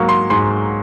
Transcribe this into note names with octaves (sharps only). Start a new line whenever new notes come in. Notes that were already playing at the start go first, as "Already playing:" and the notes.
Already playing: G#2 F#3 A#3 C#6
C6
G#2 C6